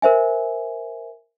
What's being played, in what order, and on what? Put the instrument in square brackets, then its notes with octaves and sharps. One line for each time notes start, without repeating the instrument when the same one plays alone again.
[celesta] A#4 C5 E5 G#5